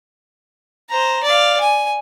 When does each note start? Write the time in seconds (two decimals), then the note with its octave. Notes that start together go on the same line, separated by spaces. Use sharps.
0.89 C5 A#5
1.23 D5 F5
1.60 G#5